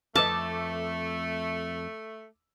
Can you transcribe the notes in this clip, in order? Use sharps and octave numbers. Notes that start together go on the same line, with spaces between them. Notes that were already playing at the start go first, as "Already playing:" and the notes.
F2 A3 B4 D#5 A5 D6 E6